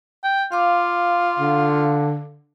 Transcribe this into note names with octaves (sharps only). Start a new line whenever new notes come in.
G5
F4 F5 D6
D3